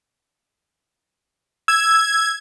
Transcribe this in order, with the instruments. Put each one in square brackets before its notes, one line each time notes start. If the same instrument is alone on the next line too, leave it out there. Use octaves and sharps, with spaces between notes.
[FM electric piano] E6 [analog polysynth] G#6